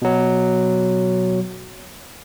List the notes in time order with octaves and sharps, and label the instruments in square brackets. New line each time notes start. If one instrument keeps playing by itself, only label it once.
[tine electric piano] B2 F#3